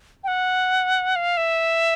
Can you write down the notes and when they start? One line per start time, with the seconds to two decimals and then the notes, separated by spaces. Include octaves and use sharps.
0.24 G5
0.28 F#5
1.16 F5
1.37 E5